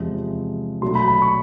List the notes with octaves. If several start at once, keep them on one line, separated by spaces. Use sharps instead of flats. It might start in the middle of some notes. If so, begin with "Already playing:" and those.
Already playing: E2 C3 F3 G#3
B2 F#3 A3 D4 C6
B5
B5
C#6